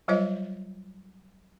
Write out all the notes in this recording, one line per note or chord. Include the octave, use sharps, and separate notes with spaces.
F#3 G3 F4 C5 C#5 D#5